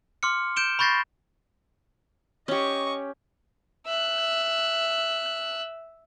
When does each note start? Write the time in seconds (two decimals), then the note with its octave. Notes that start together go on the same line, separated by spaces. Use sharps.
0.23 C6 D6 F6 C#7
0.56 G6 D7 E7 G7
0.79 B5 C#6 G6 A6 A#6 C7
2.48 C#4 G4 D#5 C#6
3.87 E5 F#6